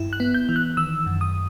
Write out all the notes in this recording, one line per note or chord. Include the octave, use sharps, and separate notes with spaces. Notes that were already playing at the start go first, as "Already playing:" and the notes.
Already playing: G2 E4
F#6
B3
G6
E3
F#6
D#3 E6
F#2
D#6